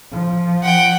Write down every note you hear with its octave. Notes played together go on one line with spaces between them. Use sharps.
F3
F#5 G5